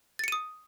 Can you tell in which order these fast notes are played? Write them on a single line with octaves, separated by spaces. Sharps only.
A6 C#7 D#7 D#6